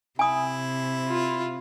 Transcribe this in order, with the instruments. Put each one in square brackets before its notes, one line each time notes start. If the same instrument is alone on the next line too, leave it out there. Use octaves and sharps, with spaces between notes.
[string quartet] C3 [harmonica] E4 [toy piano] G#5 D#6
[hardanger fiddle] F4